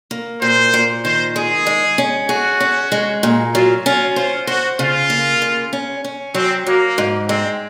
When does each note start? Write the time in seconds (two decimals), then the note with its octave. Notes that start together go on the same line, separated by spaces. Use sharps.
0.11 A#3
0.41 A#2 C5
0.74 A#2
1.04 D#3 C5
1.36 G#3 G#4
1.67 G#3
1.98 C#4
2.29 F#4 G#4
2.60 C#4
2.92 G#3
3.23 A#2
3.54 F#3 F4
3.85 C#4 F4
4.16 F4 C5
4.47 F#4 C5
4.78 C#3 F4
5.10 A#3
5.42 C#3
5.73 C#4
6.04 C#4
6.35 F#3 C4
6.67 F#3 A#3
6.98 G#2
7.29 G#3 C4